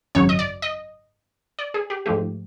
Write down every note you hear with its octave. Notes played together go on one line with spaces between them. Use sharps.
G#1 F#2 C#3 F#3 C#5
D#5
D5
D#5
D5
G#4
G4
G#2 F3 A3 G4